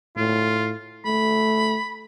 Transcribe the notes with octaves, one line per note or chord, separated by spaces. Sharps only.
A2 F4
A3 B5